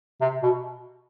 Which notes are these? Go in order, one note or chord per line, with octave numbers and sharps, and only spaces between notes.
C3
B2